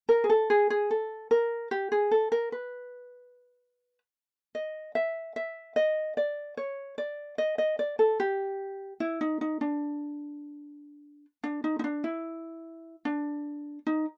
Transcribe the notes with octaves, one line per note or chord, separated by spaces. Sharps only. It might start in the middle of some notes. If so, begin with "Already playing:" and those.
A#4
G#4
A4
G#4
G#4
A4
A#4
G4
G#4
A4
A#4
B4
D#5
E5
E5
D#5
D5
C#5
D5
D#5
D#5
D5
A4
G4
E4
D#4
D#4
D4
D4
D#4
D#4
D4
E4
D4
D#4